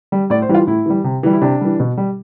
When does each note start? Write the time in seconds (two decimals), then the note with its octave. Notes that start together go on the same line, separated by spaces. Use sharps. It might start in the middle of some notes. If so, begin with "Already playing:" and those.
0.12 G3
0.30 A2 D5
0.42 C5
0.49 E3 G3
0.55 F4
0.67 A2 E4
0.86 E3 G3
1.04 C3
1.23 E3 G3
1.33 E4
1.42 C3 D4
1.61 E3 G3
1.80 B2
1.97 G3